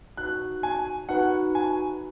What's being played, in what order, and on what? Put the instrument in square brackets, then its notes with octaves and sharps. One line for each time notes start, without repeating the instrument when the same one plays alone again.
[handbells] D#4 F#4 B4 [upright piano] F#6
[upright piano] G#5
[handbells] D#4 F#4 B4 [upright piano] F#5
[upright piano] G#5